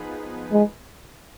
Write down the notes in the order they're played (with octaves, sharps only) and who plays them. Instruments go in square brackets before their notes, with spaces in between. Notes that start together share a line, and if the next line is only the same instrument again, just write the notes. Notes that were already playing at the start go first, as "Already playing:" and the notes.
Already playing: [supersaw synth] F3 B3 D#4 G#4 B4
[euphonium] G#3